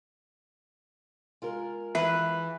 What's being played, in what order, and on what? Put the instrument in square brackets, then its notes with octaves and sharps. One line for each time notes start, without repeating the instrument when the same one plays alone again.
[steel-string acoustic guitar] G#3 F4 A#4
[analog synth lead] E3 [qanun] B4 [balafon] E5